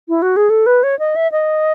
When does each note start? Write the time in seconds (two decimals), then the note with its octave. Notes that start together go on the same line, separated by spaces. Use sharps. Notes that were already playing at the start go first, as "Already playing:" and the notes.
0.08 E4
0.22 F#4
0.36 G#4
0.50 A4
0.66 B4
0.83 C#5
0.99 D#5
1.16 E5
1.32 D#5